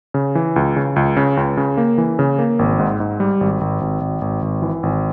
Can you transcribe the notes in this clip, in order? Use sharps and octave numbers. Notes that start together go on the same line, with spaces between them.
C#3
E3
C#2
C#3
C#2
C#3
C#2
C#3
A#3
E3
C#3
A#3
G#1
G#2
G#2
G3
G#1
G#1
G#1
G#1
G#1
G#1
E3
G#1